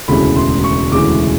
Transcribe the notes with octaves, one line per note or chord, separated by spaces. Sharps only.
E1 D2 C#3 E3 G#3 B5
C6
C#6
E1 D2 C#3 E3 G#3 D6